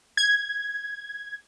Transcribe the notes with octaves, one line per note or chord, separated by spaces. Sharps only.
G#6